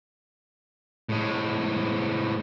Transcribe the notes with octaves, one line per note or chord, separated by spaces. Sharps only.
A2 G#3